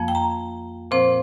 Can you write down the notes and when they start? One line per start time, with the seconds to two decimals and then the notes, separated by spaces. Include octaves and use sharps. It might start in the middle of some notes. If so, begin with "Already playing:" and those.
Already playing: F2 F3 A#3
0.08 G5
0.15 A#5
0.91 A#2 F3 C4 C5